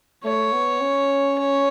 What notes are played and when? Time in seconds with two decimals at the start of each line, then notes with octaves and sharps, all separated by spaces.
0.24 A3 C#5
0.53 B3
0.81 C#4
1.38 C#5